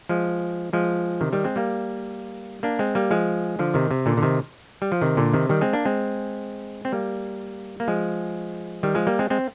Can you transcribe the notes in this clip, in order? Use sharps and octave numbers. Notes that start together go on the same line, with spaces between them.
F3 G#3
F3 G#3
C3 D#3
D#3 G3
G#3 C4
G3 A#3
A#3 D4
G#3 C4
G3 A#3
F3 G#3
D3 F3
C3 D#3
C3
A#2 D3
D3
C3 D#3
G3
F3
C3 D#3
A#2 D3
C3 D#3
D#3 G3
G#3 C4
A#3 D4
G#3 C4
C4
G3 A#3
A#3
F3 G#3
D#3 G3
F3 G#3
G3 A#3
G#3 C4
G#3 C4